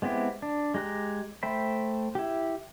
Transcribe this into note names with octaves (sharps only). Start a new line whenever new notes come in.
G#3 B3 C4 E4 G4
D4
G#3 G4 A#5 F#6
A3 C5 E5 G5 B5
E4 G4